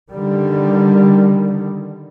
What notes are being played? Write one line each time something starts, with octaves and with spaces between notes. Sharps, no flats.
D3 D#3 G3